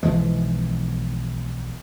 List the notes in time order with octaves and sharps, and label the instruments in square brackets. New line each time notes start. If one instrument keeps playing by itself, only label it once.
[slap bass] B1 E3 F3 G#3